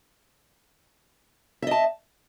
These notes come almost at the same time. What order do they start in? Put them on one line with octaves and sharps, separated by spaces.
E5 D#5 A5